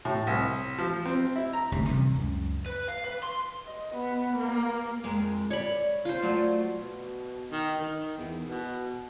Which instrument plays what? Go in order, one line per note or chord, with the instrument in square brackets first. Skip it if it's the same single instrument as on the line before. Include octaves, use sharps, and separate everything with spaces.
[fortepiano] A2
C2
F3
C4
E4
A#5
[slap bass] F#1 D2 C3
C3 D#3 E3 G3
C#2 F#2
[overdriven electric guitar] B4
F5
B4
C6
[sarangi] D#5
B3
A#3
[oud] F2 G#3 A#4
[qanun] C#5 B5 [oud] D5
[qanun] F4 C5
[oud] F#3 A3 D5
[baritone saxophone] B2
D#3
D#3
E2
B2